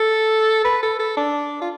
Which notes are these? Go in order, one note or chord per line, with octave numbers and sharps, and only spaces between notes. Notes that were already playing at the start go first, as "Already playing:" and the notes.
Already playing: A4
B4
A4
A4
D4
F4